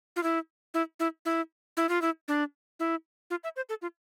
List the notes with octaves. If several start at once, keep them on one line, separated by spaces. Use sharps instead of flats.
F4
E4
E4
E4
E4
E4
F4
E4
D4
E4
F4
E5
C5
A4
F4